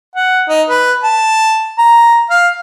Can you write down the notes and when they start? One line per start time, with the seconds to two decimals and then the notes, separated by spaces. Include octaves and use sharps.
0.15 F#5
0.49 D#4
0.69 B4
1.03 A5
1.78 A#5
2.30 F5